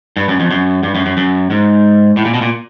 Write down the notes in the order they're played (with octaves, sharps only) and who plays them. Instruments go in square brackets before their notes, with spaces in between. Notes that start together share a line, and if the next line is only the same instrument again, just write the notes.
[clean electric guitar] G2
F#2
F2
F#2
G2
F#2
F#2
F#2
G#2
A2
A#2
B2
A#2